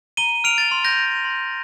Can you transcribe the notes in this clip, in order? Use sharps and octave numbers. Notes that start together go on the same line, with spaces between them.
A#5 D#7 G7
F6 D7 F7
A6
C6
G6 A#6
G6
C6